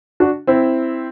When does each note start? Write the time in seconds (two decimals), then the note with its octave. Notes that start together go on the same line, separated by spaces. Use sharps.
0.20 D4 F#4
0.47 C4 E4